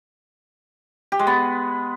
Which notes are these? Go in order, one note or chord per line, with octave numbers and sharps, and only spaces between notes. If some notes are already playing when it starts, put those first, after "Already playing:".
G4
G#3
B3